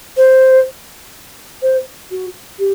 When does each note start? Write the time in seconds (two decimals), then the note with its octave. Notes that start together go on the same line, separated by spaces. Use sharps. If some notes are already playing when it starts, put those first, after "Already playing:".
0.17 C5
1.62 C5
2.11 F#4
2.59 G4